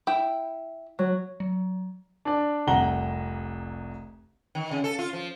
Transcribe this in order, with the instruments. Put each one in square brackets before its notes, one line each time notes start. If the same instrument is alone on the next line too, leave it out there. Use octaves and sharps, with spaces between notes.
[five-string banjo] E4 G5
[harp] F#3
[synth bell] F#3
[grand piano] D4 D5
F1 C2 F#5 A#5 G7
[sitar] D#3
C#3
A4
F4
F3